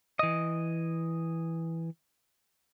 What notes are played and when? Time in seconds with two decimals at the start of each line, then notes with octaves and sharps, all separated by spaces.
0.19 E3 D#5